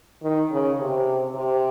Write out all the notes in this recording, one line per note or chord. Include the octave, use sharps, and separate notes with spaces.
D#3
C#3
C3
C3